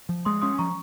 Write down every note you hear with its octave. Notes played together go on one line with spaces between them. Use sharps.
F3
G#3 C6 D#6
C#4 C6 D#6
F3 A#5 C#6